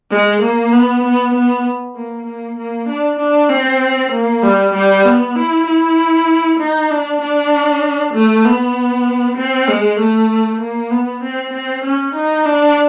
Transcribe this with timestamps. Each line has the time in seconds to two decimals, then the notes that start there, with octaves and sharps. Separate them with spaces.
0.11 G#3
0.42 A#3
0.72 B3
1.04 B3
1.34 B3
1.96 A#3
2.27 A#3
2.58 A#3
2.88 D4
3.19 D4
3.50 C4
4.12 A#3
4.42 G3
4.74 G3
5.05 B3
5.36 E4
5.66 E4
6.59 D#4
6.90 D4
7.21 D4
8.14 A3
8.45 B3
9.37 C4
9.68 G#3
9.99 A3
10.60 A#3
10.91 B3
11.22 C4
11.53 C4
11.84 C#4
12.15 D#4
12.46 D4